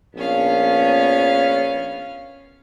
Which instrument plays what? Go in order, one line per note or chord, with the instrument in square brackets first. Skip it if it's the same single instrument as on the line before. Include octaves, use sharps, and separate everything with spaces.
[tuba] A#1 [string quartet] B3 C#4 F5